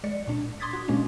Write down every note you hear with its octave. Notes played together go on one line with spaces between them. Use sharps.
G#3 D5 C#7
A#2 D4
C6 D6 D#6 G#6 A6 B6
F#4
A#2 G#3 A#3 C#4 D4